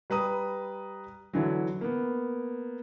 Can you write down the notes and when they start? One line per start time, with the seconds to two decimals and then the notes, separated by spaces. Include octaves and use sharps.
0.10 G3 B4 A#5 D#6
1.33 D3 E3 F#3
1.81 A#3 B3